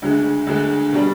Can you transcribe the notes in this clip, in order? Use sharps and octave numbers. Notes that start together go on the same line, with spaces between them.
D2 D3 G#3
D2 D3 G#3
B2 G3 D4